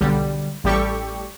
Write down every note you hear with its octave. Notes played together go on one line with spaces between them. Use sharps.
B1 D3 G3
A1 G3 G4 A4 C#6